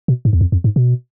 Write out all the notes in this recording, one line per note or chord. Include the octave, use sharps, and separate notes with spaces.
B2
G#2
E2
F2
F2
G#2
B2